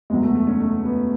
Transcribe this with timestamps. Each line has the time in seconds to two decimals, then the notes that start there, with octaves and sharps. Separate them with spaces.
0.10 F#1 E2 B2 F#3 G#3
0.23 A3
0.35 A3
0.47 C#4
0.60 A3
0.85 B3